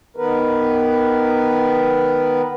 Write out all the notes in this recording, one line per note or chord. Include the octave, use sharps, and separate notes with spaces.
D#3 B3 A#4 B4